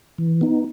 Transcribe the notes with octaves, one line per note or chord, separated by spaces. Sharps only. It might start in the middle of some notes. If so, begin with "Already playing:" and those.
E3
B3 D#4